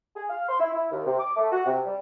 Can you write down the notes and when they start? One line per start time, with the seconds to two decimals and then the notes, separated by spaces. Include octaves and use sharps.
0.16 G#4
0.29 F5
0.48 C6
0.60 E4
0.72 E4
0.91 D#2
1.06 C3
1.18 D6
1.37 A3
1.51 F#4
1.65 C3
1.85 G3